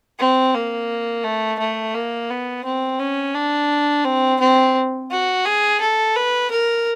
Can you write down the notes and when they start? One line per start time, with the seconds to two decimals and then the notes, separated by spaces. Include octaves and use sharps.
0.19 C4
0.54 A#3
1.24 A3
1.59 A3
1.94 A#3
2.30 B3
2.65 C4
3.00 C#4
3.35 D4
4.05 C4
4.40 C4
5.11 F#4
5.45 G#4
5.81 A4
6.16 B4
6.51 A#4